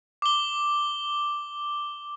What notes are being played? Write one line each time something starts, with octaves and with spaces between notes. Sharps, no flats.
D6 G7